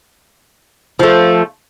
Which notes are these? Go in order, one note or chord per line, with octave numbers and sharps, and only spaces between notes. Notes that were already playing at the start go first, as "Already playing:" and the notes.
F3 A3